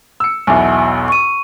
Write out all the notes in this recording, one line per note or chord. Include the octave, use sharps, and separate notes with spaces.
E6 C#7
B1 E2 B2 E5 G#5
C#6 D#7